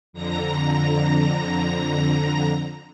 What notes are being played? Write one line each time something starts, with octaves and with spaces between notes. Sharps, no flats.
F2 D3 A#5 A#6